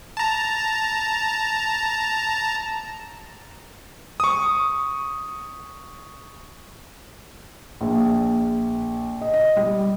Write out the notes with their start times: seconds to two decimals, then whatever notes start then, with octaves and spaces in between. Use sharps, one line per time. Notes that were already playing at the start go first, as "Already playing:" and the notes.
0.17 A5 A#5
4.20 C#6 D#6
7.81 A#1
9.21 D#5
9.34 D#5
9.57 G3